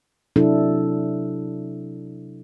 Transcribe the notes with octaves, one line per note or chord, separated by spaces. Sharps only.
C3 F#3 D4 E4 A4